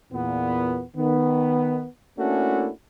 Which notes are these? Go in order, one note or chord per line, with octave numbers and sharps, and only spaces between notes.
E2 A#2 B3
D#3 B3
A3 A#3 C#4 D4 E4 F#4